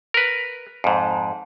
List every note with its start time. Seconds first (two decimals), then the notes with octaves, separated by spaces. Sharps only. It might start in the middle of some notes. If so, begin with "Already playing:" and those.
0.14 A#4 B4
0.84 F2 G#2